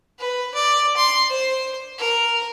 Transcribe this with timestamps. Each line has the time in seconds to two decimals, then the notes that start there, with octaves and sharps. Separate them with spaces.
0.19 B4
0.54 D5
0.97 C6
1.30 C5
1.99 A#4